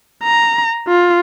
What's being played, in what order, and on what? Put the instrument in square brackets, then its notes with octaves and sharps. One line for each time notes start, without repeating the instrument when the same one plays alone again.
[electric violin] A#5
F4